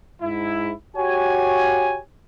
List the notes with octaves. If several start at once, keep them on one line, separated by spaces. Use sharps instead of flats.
G#2 E4
F#4 G4 C#5 G#5